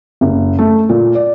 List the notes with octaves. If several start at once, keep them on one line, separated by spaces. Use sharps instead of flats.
F#1
A3
A#2
D5